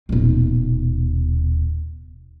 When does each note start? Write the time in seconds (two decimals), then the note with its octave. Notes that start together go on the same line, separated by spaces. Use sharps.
0.09 D#1 B2